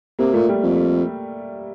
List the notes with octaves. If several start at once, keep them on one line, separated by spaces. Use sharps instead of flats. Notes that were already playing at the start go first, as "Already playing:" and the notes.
C3 A#3
A#2 A3
G3
F2